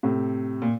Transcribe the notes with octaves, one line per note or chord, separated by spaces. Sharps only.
A2 C3
A#2